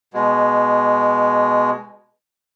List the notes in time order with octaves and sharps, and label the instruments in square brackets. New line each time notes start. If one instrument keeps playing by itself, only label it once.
[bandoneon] B2 G#3